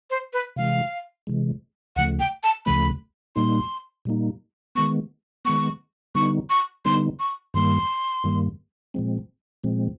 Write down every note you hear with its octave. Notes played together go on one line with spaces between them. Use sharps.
C5
B4
C3 E3 G#3 F5
C3 E3 G#3
D2 C#3 F3 A3 F#5
G5
A5
D2 C#3 F3 A3 B5
A#2 G3 A#3 D#4 C6
A#2 G3 A#3 D#4
D#3 G#3 B3 C#6
D#3 G#3 B3 C#6
D3 G3 B3 D#4 C#6
C#6
D3 G3 B3 D#4 C6
C#6
G2 D#3 G3 A#3 C6
G2 D#3 G3 A#3
A#2 F3 G#3 C4
A#2 F3 G#3 C4